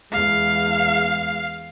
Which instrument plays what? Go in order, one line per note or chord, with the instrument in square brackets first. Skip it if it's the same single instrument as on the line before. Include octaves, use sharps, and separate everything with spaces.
[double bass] E2 G#3 [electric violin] F5